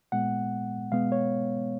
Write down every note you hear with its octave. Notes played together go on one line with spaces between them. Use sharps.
A#2 G#3 B3 F#5
B2 G#3 B3 F5
C#5